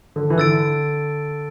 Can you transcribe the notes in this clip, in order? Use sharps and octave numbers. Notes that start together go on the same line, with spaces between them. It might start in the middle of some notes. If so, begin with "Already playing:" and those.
D3
E3
D3 E6 A6 D7